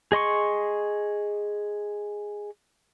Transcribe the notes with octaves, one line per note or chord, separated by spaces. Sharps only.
G#4 D#5 C6 C#6